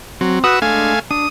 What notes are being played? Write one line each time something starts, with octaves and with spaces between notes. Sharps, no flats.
F#3 C4
F#4 B4 D#6 E6 F#6
G#3 A3 D4 F5 G#5
D4 D#6